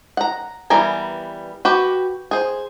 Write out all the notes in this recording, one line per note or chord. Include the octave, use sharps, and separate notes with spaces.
F#5 A#5
E3 G3 B3 A#4 G#5
F#4 G4 B4
G#4 C5